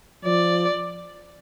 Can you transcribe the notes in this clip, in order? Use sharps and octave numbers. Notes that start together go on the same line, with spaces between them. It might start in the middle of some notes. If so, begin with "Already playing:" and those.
F3 D5